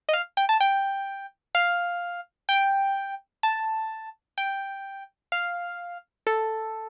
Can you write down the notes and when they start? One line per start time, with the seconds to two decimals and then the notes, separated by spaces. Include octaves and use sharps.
0.09 D#5
0.13 F5
0.37 G5
0.49 A5
0.60 G5
1.55 F5
2.49 G5
3.43 A5
4.38 G5
5.32 F5
6.27 A4